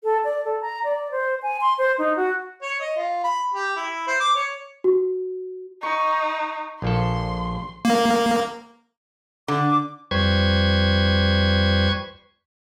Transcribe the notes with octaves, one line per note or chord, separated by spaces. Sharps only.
A4
D5
A4
A#5
D5
C5
G#5
C6
C5
D#4
F#4
C#5
D#5
F4
B5
G4
E4
C5
D6
C#5
F#4
D#4 C#6
A#1 F3 A4 C6
A#3
D3 D6
F2 G3 B4 C5 C#6 G#6